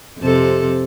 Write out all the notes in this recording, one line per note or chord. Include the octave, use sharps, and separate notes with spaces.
F2 C3 A4